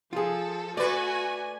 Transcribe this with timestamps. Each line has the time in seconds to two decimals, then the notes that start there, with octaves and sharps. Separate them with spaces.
0.13 F3 F4 G#4 A4
0.77 A3 F#4 B4 D5 G#5